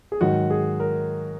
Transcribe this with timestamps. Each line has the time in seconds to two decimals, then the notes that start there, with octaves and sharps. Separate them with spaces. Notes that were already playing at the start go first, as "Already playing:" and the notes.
0.12 G#4
0.21 G#2 D#3 F#3 F#4
0.50 G#4
0.80 A#4